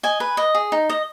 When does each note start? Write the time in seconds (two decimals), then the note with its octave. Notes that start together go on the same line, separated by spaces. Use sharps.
0.03 D#5 G#5
0.20 B4
0.37 D#5
0.55 G#4
0.72 D#4
0.89 D#5